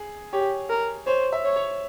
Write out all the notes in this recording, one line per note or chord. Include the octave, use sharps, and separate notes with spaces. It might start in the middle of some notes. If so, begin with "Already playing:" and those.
Already playing: G#4
G4 C#5
A#4
C5 C#5
E5
C#5
C#5